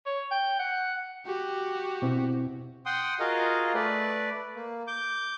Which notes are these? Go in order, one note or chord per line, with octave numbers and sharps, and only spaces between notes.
C#5
G5
F#5
F#4 G4
B2 C4 E4
F#5 G5 C6 D#6
F4 F#4 G#4 A#4 D#5 F5
A3 B4 D5
A#3
D6 G6